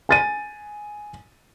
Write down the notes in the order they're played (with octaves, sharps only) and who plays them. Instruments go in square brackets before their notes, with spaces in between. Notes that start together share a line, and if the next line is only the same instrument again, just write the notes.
[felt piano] G#5 A6 D#7